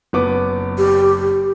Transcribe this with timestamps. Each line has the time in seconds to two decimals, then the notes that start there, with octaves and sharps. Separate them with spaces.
0.13 F#1 B3 D6
0.78 G4